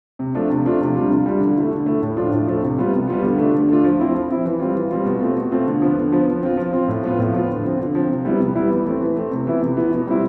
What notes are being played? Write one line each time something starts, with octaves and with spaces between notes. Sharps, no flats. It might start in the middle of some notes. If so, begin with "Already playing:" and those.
C3
F3 A3 D4 F4
C3
F3 A3 D4 F4
C3
G3 D4 F4
C3
G3 D4 F4
D3
A3 E4
D3
A3 E4
A2
F3 A3 D4 F4
A2
F3 A3 D4 F4
C3
G3 B3 F4
C3
G3 B3 F4
D3
A3 D4 F4
D3
A3 D4 F4
F3
C4 E4
F3
C4 E4
E3
G3 C4 F4
E3
G3 C4 F4
B2
A3 C4 F4
B2
A3 C4 F4
D3
F3 B3
D3
F3 B3
F3
C4 F4
F3
C4 F4
A2
F3 B3 F4
A2
F3 B3 F4
D3
F3 C4
D3
F3 C4
C3
G3 B3 E4
C3
G3 B3 E4
E3
A3 C4
E3
A3 C4
C3
E3 B3 E4
C3
E3 B3 E4
B2
G3 C4 E4